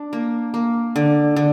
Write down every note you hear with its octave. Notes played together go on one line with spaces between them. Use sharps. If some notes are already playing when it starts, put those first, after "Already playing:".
Already playing: D4
A#3
A#3
D3
D3